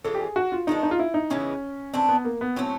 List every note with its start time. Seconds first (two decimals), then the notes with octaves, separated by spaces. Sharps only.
0.04 E3 G#3 C#4 F4 A4
0.14 G4
0.20 G#4
0.36 F#4
0.52 F4
0.67 D#3 G#3 B3 D4 D#4
0.83 D#4
0.91 F4
0.99 E4
1.14 D#4
1.30 C#3 E3 G#3 B3 C#4
1.94 E3 A3 C4 D4
2.09 B3
2.25 A#3
2.41 B3
2.56 A2 F#3 A3 C4 C#4